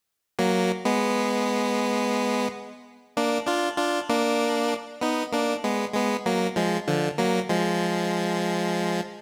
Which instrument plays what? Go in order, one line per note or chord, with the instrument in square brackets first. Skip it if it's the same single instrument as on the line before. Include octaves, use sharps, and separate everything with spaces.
[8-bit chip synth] F#3 A#3
G#3 B3
A#3 D4
D4 F4
D4 F4
A#3 D4
B3 D#4
A#3 D4
G#3 B3
G#3 B3
F#3 A#3
F3 G#3
D3 F3
F#3 A#3
F3 G#3